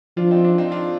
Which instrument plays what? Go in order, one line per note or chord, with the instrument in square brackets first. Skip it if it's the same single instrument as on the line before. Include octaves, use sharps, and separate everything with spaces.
[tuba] F3 [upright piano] D4 F4
[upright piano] C4 D#4
D4
C4 D#4
D4 F4